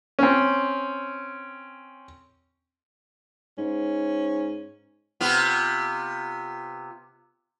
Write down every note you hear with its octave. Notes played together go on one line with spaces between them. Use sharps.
C4 C#4
G#2 C#4
C3 B3 F4